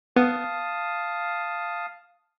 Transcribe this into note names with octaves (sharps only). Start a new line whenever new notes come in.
B3 F5 A5 D#6